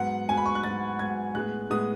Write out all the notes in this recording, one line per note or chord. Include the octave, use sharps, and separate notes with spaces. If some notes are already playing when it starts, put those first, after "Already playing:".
Already playing: G#2 F#3 B3 F#5
G#2 F#3 B3 G#5
B5
C#6
F#6
G#2 F#3 B3 A6
G#2 F#3 B3 G#6
A2 G#3 B3 F#6
A2 G#3 B3 D#6